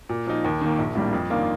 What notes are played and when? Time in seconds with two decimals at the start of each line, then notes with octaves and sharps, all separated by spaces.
0.09 A#2
0.27 F3 A#3 D#4
0.44 D#2
0.61 D#3 A#3
0.78 A#1
0.95 A2 G3 A#3 D4
1.13 F2
1.30 D#3 A#3 D4 F4